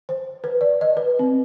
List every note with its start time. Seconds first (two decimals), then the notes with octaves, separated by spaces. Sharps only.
0.09 C5
0.44 B4
0.61 D5
0.81 D#5
0.97 B4
1.19 C4